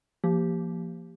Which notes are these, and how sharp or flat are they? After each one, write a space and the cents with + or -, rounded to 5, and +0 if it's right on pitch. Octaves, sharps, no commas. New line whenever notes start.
F3 -25 A#3 +0 G4 +0